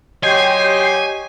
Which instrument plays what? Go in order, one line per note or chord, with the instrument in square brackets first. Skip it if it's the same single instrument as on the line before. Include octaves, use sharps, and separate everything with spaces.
[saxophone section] F#3 D#5 [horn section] G4 C#5 [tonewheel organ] G5 C6 [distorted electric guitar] G#5